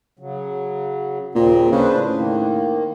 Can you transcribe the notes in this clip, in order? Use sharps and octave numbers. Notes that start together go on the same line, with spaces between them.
C#3 F#3
D#2 A#2 C#3 C4
C#3 D4 B4 C5
A2
D#3 A#3